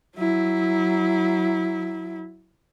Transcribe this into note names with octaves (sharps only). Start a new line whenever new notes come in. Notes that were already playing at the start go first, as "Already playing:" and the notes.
F#3 E4